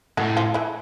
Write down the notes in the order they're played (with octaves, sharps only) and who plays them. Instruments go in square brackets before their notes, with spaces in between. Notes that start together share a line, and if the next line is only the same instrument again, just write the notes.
[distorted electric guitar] A2 [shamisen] F#3 F#4
[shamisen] F3 F4
E3 E4